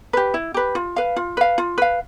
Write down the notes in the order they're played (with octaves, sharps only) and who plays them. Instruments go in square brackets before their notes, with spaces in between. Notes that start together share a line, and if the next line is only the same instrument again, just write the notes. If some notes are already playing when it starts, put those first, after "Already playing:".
[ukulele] G4 B4
E4
G4 B4
F4
B4 F5
F4
B4 F5
F4
B4 F5